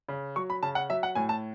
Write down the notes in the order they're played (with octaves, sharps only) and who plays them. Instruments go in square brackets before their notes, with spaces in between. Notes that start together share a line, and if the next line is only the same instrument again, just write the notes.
[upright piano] C#3
F#3 C#6
B5
C#3 A5
F#5
F#3 E5
F#5
A2 G#5
A5